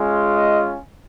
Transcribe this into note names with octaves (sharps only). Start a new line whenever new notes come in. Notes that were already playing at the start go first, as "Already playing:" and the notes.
Already playing: G#3 C#4 F4
D#5